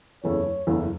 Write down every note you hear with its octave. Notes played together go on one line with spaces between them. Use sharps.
F#1 E2 C#3 A3 C#5
F#1 E2 C#3 A3